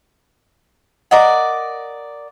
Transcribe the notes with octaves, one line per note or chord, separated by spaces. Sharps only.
A#4 D5 D#5 F#5